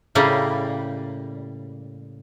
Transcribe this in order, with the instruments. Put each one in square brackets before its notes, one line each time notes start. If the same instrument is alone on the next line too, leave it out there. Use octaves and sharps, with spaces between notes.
[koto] A2 C#3 G3 A#3